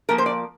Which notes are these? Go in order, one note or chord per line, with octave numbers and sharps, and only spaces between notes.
A#2 F3 A#3 A#4
C5
D5